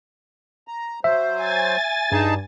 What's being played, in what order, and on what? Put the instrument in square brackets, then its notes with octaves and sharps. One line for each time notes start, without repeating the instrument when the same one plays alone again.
[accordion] A#5
[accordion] F#3 C5 [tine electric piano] E5
[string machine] G#5 A6
[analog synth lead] G2 [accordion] D#4 G#4 A5